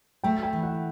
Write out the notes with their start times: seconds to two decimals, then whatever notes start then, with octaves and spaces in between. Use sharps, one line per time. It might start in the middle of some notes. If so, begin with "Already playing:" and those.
0.24 A3 G5
0.43 G5
0.53 E3
0.63 F#5